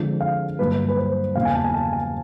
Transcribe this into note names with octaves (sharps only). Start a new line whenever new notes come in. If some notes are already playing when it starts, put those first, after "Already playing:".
Already playing: D3 F3 G#3 C4
F5
G2 D3 F#3 A#3 B4
B4
C5
E2 C#3 F#3 A#3 F5
G#5
A5
G#5
A5
G#5